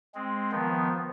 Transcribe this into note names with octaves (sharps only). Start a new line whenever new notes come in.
G#3 C4
D#3 F3 B3